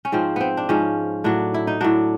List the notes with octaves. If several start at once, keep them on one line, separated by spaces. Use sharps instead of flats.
C#4
G#2 F3 C4
B3 C4
D4
G#2 F3 C#4
A2 F#3 D4
E4
D#4
A2 F#3 D4